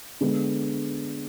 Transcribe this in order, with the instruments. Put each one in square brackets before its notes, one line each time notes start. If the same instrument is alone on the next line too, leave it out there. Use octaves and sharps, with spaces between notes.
[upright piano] D3 G#3 B3